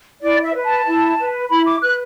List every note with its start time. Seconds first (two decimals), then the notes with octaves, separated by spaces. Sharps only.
0.21 E4 D5
0.43 E5
0.54 B4
0.65 A5
0.86 E4
1.19 B4
1.50 E4 B5
1.66 D6
1.82 B4 F#6